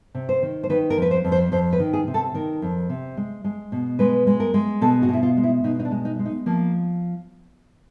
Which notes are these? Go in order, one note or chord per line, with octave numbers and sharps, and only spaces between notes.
C3
C5
D#3
C5
D#3 B4
A#4
F2 B4
C5
F2
C5
F2 C5
B4
D#3
G#4
C3
A4
D#3 A#4
F2
C3
G#3
G#3
B2
G#3 B4
G#3
A#4
G#3
B2 A4
F#4
B2 E4
F4
G#3
E4
B2 D#4
D#4
D4
G#3
D#4
G#3
D#4
F3 A#3